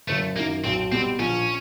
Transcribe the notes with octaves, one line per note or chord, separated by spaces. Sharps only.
F#1 A3
F#2 D#3 A#3
B1 C4
B2 G3 C4
A#1 C#4